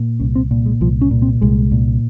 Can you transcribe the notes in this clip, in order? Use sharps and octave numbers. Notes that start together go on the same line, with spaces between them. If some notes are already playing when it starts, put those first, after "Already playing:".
Already playing: A#2
C2 C#4
C4
A#2
G#3
C2 F3
C#4
A#2
C4
C2 G#3
A#2